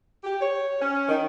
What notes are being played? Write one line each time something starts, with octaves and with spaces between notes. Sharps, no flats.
G4
C#5
C#4
D#3